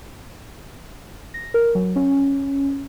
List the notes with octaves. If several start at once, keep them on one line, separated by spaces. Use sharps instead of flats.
A#6
A#4
F#3
C#4